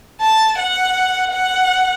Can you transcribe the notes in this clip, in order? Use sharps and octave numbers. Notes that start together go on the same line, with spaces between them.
A5
F#5
F#5